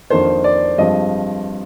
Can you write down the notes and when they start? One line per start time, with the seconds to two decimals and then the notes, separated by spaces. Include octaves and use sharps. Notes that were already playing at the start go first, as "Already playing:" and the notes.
0.10 F2 D#3 A#3 D4 C5
0.44 D5
0.78 G2 F3 G#3 C4 D#5